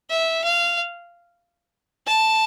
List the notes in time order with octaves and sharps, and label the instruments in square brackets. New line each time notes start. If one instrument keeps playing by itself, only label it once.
[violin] E5
F5
A5